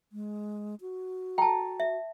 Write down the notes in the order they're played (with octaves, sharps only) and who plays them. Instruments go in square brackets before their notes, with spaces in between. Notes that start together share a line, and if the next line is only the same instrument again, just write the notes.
[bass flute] G#3
F#4
[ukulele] A4 A#5 [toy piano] G5 A5
[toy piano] E5